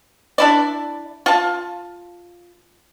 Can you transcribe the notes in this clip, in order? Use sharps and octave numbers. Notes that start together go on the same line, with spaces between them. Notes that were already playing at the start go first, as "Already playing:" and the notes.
D4 E4 D5
F4 A5